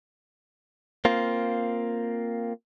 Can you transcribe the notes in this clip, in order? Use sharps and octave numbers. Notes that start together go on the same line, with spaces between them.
A#3 C4 F4